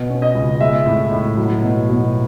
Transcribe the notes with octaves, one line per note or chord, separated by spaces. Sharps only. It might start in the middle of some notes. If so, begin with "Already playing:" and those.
Already playing: B2
C#4
D#5
C#2
G#3 E5
A2
A2
F#3
B2
B2